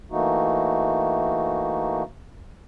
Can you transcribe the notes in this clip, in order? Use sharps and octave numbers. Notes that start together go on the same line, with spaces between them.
E3 A3 A#3 D#4 F#4